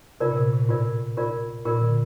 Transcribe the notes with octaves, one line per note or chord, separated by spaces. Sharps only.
C3 F4 A#4 D5
A#2
C3
A#2
A2 F4 A#4 D5
F4 A#4 D5
A#2 F4 A#4 D5
A#2 D3